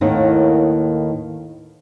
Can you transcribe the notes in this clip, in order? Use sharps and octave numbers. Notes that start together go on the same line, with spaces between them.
D#2 A2 D#3 A#3 B3 D#4